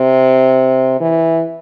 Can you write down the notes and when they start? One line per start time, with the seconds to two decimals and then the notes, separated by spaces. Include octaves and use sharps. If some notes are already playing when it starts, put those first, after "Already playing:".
Already playing: C3
1.00 E3